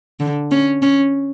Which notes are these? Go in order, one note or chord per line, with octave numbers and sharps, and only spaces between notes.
D3
C#4
C#4